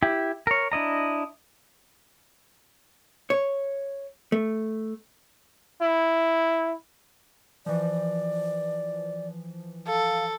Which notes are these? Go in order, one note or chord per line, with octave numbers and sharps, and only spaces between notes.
E4 G4
A#4 C#5
D4 E4 D#5 A#5
C#5
A3
E4
E3 F3 D5
A4 F5